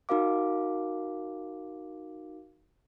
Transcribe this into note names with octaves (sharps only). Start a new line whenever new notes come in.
D#4 F#4 A#4 F5 D6